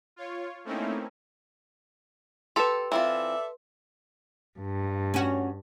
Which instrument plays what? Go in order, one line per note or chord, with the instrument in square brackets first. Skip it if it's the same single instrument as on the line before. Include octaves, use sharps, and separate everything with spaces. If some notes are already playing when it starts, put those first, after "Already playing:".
[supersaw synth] F4 C#5
A3 A#3 C4 C#4 D#4 E4
[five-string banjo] G4 A4 [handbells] B4 C6
[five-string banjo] E3 C4 F4 [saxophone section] A4 D5 E5
[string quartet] G2
[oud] C#4 F#4